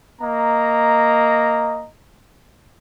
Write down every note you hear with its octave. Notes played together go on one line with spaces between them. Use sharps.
A#3 D#5 A#5